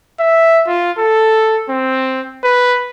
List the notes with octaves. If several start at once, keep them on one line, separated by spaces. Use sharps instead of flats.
E5
F4
A4
C4
B4